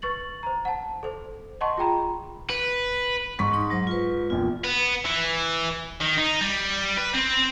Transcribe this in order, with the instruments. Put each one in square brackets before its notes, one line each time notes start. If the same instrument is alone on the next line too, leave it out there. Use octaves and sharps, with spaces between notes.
[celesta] B4 C#6 A6 F#7
C5 A#5
F#5 A5
A4 C5
D#5 F#5 A5 C6 C#6
F4 G#4 G5 A#5 B5
[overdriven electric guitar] B4
[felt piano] G#2 C#6 B6
[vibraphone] D#4 C6 D#6
F#3 C5
F4 B4
[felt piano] A#1 E2 [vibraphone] F4
[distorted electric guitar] B3
E3
D#3
D#4
G3
B4
C4